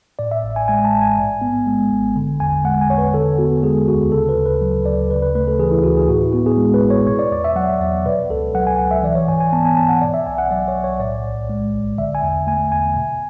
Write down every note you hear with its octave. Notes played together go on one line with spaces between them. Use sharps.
A2 D5
E5
A1
G#5
G#3 G#5
A5
A1
G#5
G#2
B3
G#3
G#1
D3
E2 G#5
G#3 F#5
G#5
E2 C#5
B4
D3 A4
B3 F#4
G#3 G#4
D2 F#4
C#3 A4
B4
D2
B4
F#3
D2 D5
C#3 B4
B4
A3 B4
A4
E3 G#4
E4
D2 F#4
G#4
A2 F#4
E4
B3 F#4
G#4
G#3
B4
A1
C#5
B2 C#5
D5
E2 D5
E5
F#3 F#5
E2 D5
B2 B4
C#2 A4
F#3 F#5
G#5
C#2 F#5
E5
E3 D5
C#5
G#2 G#5
G#5
B3 A5
G#5
G#2 A5
F#5
B2 D5
E5
B1 G#5
F#5
F#3 D5
C#5
B1
C#5
A2 D5
A1
G#3
A1
D3 E5
G#5
E2
A3 G#5
E2 G#5
B2